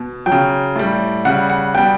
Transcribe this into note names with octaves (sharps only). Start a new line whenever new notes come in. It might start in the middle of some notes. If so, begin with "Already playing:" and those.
Already playing: B2
F#3 G5
C#3
A2 G3
C#3 G3 F#5
F#5
B2 G3 G5